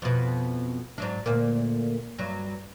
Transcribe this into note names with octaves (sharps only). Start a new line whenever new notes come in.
F2 B2
G#2 F#3 D4
D2 A#2 A#3
G2 F#3